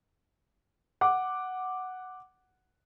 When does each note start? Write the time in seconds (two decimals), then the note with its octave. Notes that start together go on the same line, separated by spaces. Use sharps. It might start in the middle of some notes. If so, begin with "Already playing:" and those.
1.01 F#5 D6